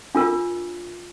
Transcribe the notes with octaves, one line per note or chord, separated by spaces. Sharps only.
D4 F4 A#4